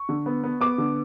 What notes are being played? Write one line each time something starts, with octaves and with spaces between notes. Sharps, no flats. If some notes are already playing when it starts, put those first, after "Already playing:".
Already playing: C#6
D3
B3
B3
B3 D6
D3